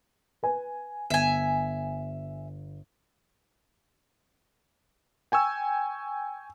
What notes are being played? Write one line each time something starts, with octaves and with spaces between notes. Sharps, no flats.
B4 G#5
G1 E5 G#5
G5 G#5 C#6 E6